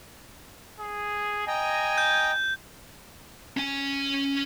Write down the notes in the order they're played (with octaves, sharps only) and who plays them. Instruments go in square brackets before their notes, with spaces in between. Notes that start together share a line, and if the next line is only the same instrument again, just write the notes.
[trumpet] G#4
[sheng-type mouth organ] D#5 G5 A#5 [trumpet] G#5
[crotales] G6
[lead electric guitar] C#4 G#5